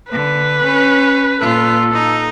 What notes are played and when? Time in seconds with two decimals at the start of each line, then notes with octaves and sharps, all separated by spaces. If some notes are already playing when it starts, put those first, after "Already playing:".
0.12 D3 B4
0.64 C#4
1.40 A#2 F4 A4
1.93 D#4